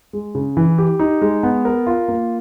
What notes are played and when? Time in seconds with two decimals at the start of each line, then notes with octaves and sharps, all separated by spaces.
0.13 G#3
0.35 C#3
0.57 E3
0.78 G4
0.99 D#4
1.21 G#3
1.43 B3
1.65 A#4
1.87 F4
2.08 A#3